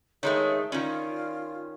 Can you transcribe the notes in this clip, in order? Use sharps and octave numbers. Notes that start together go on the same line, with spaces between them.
D#3 G#3 A3 G#4 C#5
D#3 C#4 F4 D5